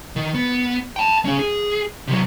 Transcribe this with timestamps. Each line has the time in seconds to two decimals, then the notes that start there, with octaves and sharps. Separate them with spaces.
0.16 D#3
0.34 B3
0.96 G5 A5
1.25 C#4 G#4
1.39 G#4
2.08 C3 F#3